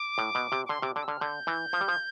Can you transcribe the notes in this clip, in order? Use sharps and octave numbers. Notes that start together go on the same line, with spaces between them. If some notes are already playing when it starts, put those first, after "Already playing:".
Already playing: D6
A2
B2
C3
D6
D3 C6
C3 D6
D3 D6
E6
D3 F6
D3 G6
E3
F3
G3
F3